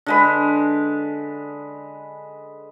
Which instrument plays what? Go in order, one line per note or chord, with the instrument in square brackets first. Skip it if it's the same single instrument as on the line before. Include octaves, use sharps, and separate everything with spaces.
[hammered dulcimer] D3 G#3 B4